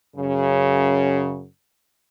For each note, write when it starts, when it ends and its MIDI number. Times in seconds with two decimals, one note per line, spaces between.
0.16 1.45 42
0.16 1.45 49